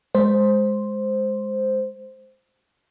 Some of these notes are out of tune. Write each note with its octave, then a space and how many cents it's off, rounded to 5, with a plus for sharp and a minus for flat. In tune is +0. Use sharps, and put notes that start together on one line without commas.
G#3 +0 C5 +0